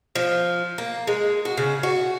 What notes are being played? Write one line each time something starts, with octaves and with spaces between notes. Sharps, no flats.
F3
A#3
G#3
F#4
C#3
F#4